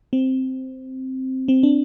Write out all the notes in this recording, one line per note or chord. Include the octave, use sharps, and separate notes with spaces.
C4
C4
D4